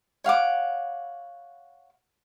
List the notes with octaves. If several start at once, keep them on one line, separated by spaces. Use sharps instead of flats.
C#5 F5 F#5 D6